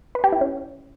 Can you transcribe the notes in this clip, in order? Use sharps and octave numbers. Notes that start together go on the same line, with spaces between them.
B4
G4
E4
C#4